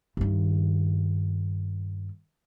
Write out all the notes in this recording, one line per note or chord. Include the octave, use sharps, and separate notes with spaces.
G2 D#3